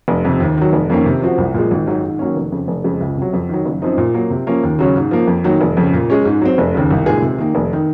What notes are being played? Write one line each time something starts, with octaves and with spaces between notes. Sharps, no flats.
F1
F2 C3
D#2
D#3 F#3
F1
F2 D#3 A#3 C#4
C3
F3 C4 F#4
C2
A#2 F3 G#3
G#1
G#2 D#3 F#3
G#2
D#3 F#3 A#3 C#4
F1
F2 C#3
F1
F2 C#3 G#3
C#2
C3 F#3
F2
D#3 F#3
F#1
F#2 F3 C4 D#4
A#2
F#3 A#3
C3
F3 A#3 C#4
D#2
C#3 F#3 C#4
G#2
F3 A#3
F2
D#3 F#3 A#3
F1
F2 C#3
A#2
G#3 C#4
G#2
F#3 C4
F1
D#2 C#3
C2
A#2 G#3 D#4 G#4
C3
D#3 A#3
F1
D#3